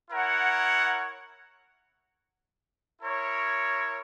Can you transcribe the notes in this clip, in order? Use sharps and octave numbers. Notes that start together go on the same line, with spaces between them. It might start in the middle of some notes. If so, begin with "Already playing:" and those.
E4 A#4 C#5 F#5
E4 A#4 C#5